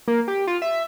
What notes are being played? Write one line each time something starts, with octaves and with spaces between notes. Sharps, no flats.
A#3
G4
F4
E5